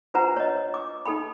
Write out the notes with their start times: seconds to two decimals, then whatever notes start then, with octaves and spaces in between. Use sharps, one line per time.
0.14 D4 F4 B4 C5 F#5 A#5
0.37 C#5 D#5
0.74 D6
1.06 D#4 A4 G5 B5